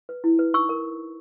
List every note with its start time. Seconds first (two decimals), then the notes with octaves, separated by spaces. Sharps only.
0.09 B4
0.24 E4
0.39 B4
0.54 D#4 C#6 E6
0.69 A#4